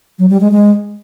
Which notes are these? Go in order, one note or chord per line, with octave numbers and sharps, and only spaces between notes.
F#3
G3
G#3
G#3